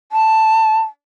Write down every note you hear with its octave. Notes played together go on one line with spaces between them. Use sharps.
A5